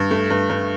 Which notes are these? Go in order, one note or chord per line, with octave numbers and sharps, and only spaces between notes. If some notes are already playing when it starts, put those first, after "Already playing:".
Already playing: G2
A3
G2
G2